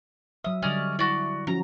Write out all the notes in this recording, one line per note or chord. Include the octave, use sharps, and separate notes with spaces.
F#3 E5 D#6
D3 G3 C#4 D5 D#5
E4 F#4 D5
F3 C#4 F#4 A#5